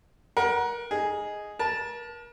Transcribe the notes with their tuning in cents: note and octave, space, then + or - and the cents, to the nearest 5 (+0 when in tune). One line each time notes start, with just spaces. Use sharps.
A#4 +30 F#5 +0
D#4 +0 G#4 +0
A#4 +40 A5 +0